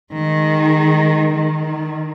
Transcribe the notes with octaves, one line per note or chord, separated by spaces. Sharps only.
D#3 G#3
D#3